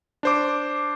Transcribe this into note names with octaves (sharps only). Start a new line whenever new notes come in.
D4 C5 D6